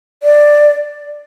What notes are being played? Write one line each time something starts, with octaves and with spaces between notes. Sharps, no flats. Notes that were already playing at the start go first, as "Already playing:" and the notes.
D5